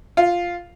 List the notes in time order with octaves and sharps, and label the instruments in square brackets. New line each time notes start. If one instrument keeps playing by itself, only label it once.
[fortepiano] F4